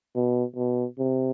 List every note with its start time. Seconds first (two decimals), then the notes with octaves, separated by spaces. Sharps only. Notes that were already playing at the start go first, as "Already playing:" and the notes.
0.15 B2
0.56 B2
0.99 C3